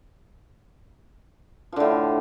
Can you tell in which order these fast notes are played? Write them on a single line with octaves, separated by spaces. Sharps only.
F3 D3 A2